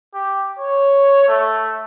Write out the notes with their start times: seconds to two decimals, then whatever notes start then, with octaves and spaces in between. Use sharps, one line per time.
0.14 G4
0.59 C#5
1.28 A3